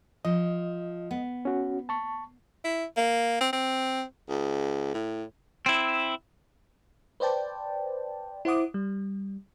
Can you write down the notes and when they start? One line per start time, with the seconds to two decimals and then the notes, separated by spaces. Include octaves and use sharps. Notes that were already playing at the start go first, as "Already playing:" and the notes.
0.25 F3 D#5
1.11 B3
1.45 C#4 F#4
1.89 A5 C#6
2.65 E4
2.97 A#3
3.41 C4
3.53 C4
4.29 C#2
4.94 A2
5.66 C4 E4
7.20 B4 C5 D5 G5 A5
8.45 E4 C5 F#5 D6 D#6
8.74 G3